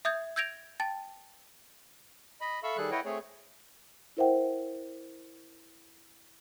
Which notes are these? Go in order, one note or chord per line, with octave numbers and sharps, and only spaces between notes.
E5 D#6 G6 G#6
E6 G6 G#6 A#6 D7 F7
G5 A5 A6
D#5 B5
A4 E5 F5 B5 C#6 E6
D#3 G3 G#4 A4 F#6
E4 B4 C#5 D#5 F#5 G5
A3 C4 G#4 C#5
E4 A#4 C5 E5 F#5 G5